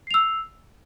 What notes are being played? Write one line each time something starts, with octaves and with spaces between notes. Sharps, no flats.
E6 C7 F7